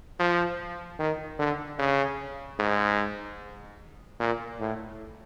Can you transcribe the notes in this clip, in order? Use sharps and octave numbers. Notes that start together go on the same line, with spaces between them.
F3
D#3
D3
C#3
G#2
A#2
A2